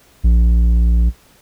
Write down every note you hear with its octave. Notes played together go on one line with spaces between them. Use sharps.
A#1